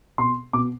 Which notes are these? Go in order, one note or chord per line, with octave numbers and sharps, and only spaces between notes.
B2 C6
B2 D6